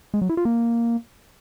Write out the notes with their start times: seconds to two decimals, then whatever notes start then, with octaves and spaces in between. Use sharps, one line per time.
0.14 G#3
0.22 F#3
0.29 E4
0.37 F4
0.45 A#3